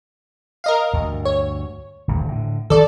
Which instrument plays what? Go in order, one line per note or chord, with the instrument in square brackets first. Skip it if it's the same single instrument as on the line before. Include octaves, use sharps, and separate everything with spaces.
[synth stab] A#4 D#5 F5
[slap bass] D2 G2
[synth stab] C#5
[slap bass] D#1 D2 G2
A2 D3
[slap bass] D#3 F#3 C4 [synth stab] A4 D5